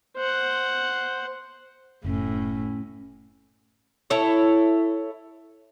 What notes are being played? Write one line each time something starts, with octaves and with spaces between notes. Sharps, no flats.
C5 F#5
F#1 A2 C#4
E4 A4 C#5